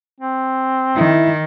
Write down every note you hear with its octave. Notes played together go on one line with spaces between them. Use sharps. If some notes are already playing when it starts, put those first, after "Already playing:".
C4
D#3 E4